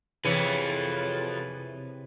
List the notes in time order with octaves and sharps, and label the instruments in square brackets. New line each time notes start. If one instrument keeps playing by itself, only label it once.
[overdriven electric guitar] F2 [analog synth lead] C3 [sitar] E3 [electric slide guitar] G#4 C#5